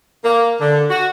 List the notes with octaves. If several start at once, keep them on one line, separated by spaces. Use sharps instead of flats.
A#3
D3
F#4